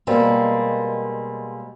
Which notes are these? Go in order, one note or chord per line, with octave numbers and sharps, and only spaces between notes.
B2 G3 G#3 A#3 C4